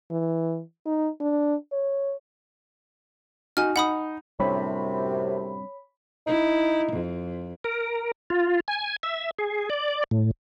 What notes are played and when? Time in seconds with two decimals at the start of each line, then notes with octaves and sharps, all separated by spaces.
0.11 E3
0.85 D#4
1.20 D4
1.72 C#5
3.57 D#4 F#4 G#5 F6
3.76 D#4 F#5 B5 D#6
4.40 F#2 A2 C3 G3 C4 D4 C#5 B5
6.27 D#4 E4
6.92 F2
7.64 A#4
8.30 F4
8.68 G#5
9.03 E5
9.38 G#4
9.70 D5
10.11 A2